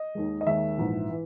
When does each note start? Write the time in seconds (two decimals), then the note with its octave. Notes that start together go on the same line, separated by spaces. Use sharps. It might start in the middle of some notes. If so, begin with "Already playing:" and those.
Already playing: D#5
0.15 D#2 D#3 G#3
0.41 D#5
0.47 D#2 D#3 G#3 E5
0.78 A#1 G#2 E3
1.10 E3